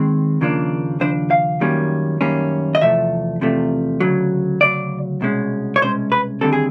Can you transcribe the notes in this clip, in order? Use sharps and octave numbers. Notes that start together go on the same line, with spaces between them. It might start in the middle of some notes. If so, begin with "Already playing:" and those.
Already playing: D#2 D#3 G#3 C4
D#2 C#3 F3 A#3 D4
D#2 C#3 F3 D4 C5
F5
F#2 D#3 G3 A#3 C#4
F#2 D#3 G3 A#3 C#4
D#5
E2 C3 F3 A3 E5
E2 C3 F3 A3
D2 C#3 F#3
D2 C#3 F#3 D5
C2 B2 G#3 C#4
C#5
C2 B2 G#3 C#4 C5
B4
D#2 D3 G3 C4 A4
G#4